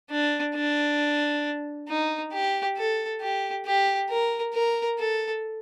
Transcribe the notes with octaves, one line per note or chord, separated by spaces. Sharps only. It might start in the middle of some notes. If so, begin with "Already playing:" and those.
D4
D4
D#4
G4
A4
G4
G4
A#4
A#4
A4